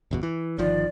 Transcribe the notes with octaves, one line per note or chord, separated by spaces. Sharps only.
G1 E2 B2
E3
G1 D#3 F3 D5